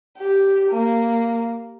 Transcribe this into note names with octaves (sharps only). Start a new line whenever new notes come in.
G4
A#3